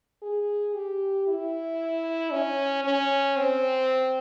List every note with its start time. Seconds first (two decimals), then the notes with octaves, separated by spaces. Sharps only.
0.22 G#4
0.75 G4
1.27 E4
2.32 C#4
2.84 C#4
3.37 C4